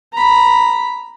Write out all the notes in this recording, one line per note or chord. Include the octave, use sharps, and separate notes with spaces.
A#5 B5